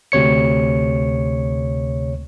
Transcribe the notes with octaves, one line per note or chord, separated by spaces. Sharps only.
D2 C3 C#5 C#7